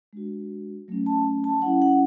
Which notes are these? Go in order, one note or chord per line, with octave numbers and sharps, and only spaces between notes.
G#3 D4 F#4
F#3 A3 C#4
A5
A5
F#3 C#4 E4 F#5
F#5